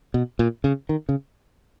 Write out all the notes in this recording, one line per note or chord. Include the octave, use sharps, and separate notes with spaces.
B2
A#2
C#3
D#3
C#3